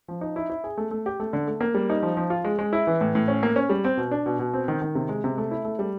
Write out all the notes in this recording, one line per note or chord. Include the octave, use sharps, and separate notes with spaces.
F3
D#4
E4
E4
G#4
A3
A3
G4
A3
D3
A3
A#3
G3
D#4
F3
F3
F4
G#3
G#3
E4
E3
A2
A2
C#4
A#3
C#4
G3
C4
B2
D4
B2
B2
C4
D#3
D#3
C3
G#3
C3
A3
E4
A3
G3